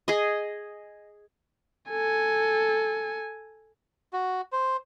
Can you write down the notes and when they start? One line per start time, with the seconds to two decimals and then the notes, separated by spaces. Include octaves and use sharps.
0.08 G#4 D#5
1.90 A4 G#5
4.13 F#4
4.52 C5